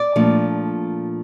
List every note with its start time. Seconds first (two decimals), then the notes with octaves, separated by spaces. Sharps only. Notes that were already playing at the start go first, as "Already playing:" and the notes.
Already playing: D5
0.16 A#2 F3 A3 D4